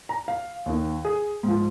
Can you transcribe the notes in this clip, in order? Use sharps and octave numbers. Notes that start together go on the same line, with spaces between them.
A#5
F5
D#2 D#3
G#4
G#2 F3